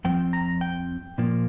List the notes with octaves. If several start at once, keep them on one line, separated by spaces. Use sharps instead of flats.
F2 F3 C4 G5
A#5
G5
A#2 F3 A#3